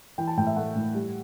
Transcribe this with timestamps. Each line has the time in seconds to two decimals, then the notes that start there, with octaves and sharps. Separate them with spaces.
0.18 E3 G5
0.27 A5
0.37 A2 G5
0.47 E5
0.56 A3 F#5
0.76 A2
0.94 G3